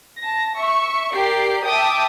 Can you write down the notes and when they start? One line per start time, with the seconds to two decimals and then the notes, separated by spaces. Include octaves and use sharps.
0.19 A5 A#6
0.55 E5 C#6
1.12 G4 A#4 D5 C7
1.67 E5 G5 A5 D6 D#6